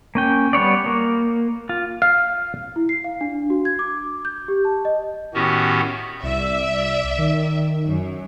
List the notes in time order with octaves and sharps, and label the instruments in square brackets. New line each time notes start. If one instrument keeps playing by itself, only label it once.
[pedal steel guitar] A#3 C#4 G5
G3 B3 C#5 D5
A#3
F4
[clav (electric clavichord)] F5
[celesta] E4
C7
F5
D4
F#4
G#6
D6
G6
G4
A5
D#5
[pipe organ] A2 D#3 B3 C#4 F#4 G4
[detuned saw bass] C2 [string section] D5 E5
[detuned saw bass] D#3
[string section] F#2